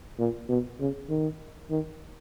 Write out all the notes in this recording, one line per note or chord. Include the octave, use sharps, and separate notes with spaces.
A#2
B2
C#3
D#3
D#3